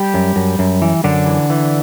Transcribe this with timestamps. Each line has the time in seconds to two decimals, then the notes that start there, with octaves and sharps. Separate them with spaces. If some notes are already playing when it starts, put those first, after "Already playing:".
Already playing: G3 G4
0.14 F#2
0.36 F#2
0.59 F#2
0.82 E3
1.04 F#2 D3 D4
1.26 E3
1.50 E3